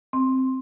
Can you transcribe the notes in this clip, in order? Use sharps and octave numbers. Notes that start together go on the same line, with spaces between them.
C4